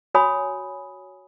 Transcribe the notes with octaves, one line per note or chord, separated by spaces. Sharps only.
F#4 C#5 G#5 B5 D#6